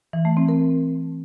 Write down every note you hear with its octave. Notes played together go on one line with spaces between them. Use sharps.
E3
A3
C4
A#4